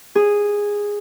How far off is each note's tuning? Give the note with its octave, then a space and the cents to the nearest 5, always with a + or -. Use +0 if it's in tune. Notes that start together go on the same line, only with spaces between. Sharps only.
G#4 -10